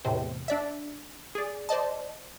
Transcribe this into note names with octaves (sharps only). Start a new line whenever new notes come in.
E2 A2 C3 C4
D4 D5 E5
G#4 D5
C5 D5 D#5 A5